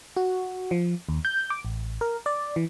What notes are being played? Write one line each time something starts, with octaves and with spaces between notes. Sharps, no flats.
F#4
F3
D#2
G6
D6
A1
A#4
D5
E3